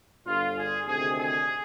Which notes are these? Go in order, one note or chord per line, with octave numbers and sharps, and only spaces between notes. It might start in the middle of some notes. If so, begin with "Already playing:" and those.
G1 G2 D3 F4
G#4
D2 C3 D#3 G#4
G#4